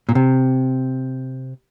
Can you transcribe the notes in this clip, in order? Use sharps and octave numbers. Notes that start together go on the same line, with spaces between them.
A#2
C3